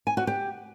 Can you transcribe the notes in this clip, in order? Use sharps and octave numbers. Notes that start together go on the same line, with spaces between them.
G#5
F#4
G4